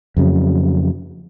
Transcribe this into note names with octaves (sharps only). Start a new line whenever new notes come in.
F2 C#3 F#3